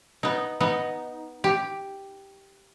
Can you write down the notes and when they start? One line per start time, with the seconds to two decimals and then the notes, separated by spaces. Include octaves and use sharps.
0.23 B3 D#4
0.60 B3 D#4
1.44 G4